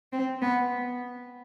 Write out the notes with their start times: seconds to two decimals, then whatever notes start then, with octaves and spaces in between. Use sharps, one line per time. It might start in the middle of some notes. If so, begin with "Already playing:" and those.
0.13 C4
0.42 B3